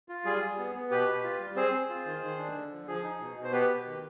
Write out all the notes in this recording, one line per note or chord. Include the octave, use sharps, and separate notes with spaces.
F4
G3 G#4
G3
B3
B3
B2 G4 B4
B2
F4
G3
C4 G#4 C5
C4
F4
D#3
D#3
D4
D3
F3
F3 G#4
D#4
B2
B2
C5
B3 G4 B4
B2
D#3